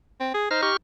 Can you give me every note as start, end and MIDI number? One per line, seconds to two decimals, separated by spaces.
0.20 0.33 60
0.34 0.47 68
0.51 0.70 63
0.51 0.61 72
0.51 0.61 89
0.62 0.77 67
0.62 0.77 85
0.62 0.77 89